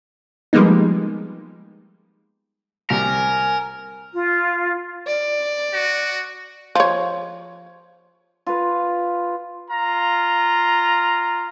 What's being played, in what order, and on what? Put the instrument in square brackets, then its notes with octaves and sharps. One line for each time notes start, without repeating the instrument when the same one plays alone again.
[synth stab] F3 G3 G#3 A#3 B3 D#4
[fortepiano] C2 C3 [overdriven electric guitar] A#4 [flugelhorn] G#5
[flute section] F4
[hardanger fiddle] D5
[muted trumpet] F#4
[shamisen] F3 C#5
[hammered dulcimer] F4 B4
[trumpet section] F4 A#5